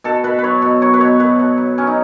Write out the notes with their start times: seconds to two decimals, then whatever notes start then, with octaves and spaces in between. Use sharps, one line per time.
0.04 B2 A4
0.24 B2 B4
0.38 B4
0.44 F#3 C#5
0.62 B2
0.82 F#3 C#5
0.94 B4
1.00 B2 C#5
1.20 B2 B4
1.39 B2
1.58 F#3
1.78 F#3 C#4
1.87 D#4